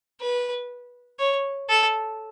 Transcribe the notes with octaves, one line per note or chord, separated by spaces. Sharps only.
B4
C#5
A4